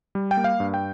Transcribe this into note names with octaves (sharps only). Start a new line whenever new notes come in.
G3
G5
A#3
F5
G2
G5